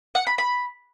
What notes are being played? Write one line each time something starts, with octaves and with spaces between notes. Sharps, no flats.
F#5
B5
B5